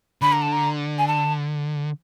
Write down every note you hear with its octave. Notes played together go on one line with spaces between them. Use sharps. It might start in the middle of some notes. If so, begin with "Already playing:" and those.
D3 B5
A#5
A5
A#5
G#5
A5